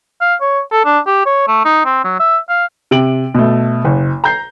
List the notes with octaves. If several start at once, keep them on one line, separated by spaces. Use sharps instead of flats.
F5
C#5
A4
D4
G4
C#5
A3
D#4
C4
F#3
E5
F5
C3 D7 F#7
B2 A3
F#1
A#5 G6 C7